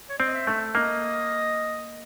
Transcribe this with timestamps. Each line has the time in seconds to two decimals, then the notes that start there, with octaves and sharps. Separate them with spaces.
0.10 C#5
0.18 C4 D5
0.26 D#5
0.34 E5
0.47 A3
0.75 A#3 D#5